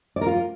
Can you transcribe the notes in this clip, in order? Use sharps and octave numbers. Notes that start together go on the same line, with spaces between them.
D5
A#4
F4